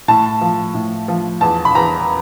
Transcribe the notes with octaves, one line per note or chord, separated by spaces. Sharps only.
A2 A5
F3
A2
F3
E2 A5
B5
E2 A#5